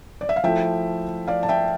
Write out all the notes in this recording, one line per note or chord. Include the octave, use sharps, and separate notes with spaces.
D5
E5
F5
F3 A3 E4 E5 G5
D5 F5
A5
E5 G5